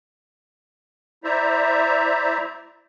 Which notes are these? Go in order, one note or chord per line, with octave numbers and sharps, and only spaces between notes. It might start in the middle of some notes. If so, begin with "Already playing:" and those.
E4 C5 D5 E5 A#5